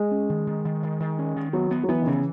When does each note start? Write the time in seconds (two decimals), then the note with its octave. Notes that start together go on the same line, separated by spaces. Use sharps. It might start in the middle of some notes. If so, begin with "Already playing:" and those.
Already playing: G#3
0.11 C#4
0.29 D#3
0.47 D#3
0.65 D#3
0.83 D#3
1.00 D#3
1.19 C#4
1.36 D#3
1.53 F#3 B3
1.71 B3
1.84 F#3
1.89 E3 B3
2.02 D#3
2.06 C#3 E3